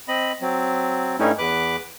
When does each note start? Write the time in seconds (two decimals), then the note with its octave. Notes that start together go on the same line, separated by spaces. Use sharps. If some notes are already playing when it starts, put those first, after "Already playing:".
0.08 C4 D#5 B5
0.41 F#3 C4
1.19 G2 G3 A3 C#4 D#4 E4
1.38 E2 B4 D6 F#6